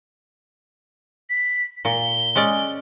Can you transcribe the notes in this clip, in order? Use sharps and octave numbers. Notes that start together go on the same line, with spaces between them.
B6
A#2 G7
G#3 C#4 D5